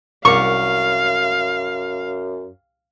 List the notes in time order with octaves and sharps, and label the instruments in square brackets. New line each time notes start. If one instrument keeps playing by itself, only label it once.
[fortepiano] C2 A#4 D6 [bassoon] F#2 [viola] F5 [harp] C#6